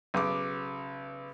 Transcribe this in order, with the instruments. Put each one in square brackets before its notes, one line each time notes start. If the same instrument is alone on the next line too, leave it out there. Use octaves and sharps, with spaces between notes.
[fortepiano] B1 [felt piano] C#3 D6